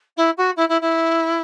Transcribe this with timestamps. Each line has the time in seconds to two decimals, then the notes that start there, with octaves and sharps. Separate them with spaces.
0.17 E4
0.37 F#4
0.56 E4
0.68 E4
0.81 E4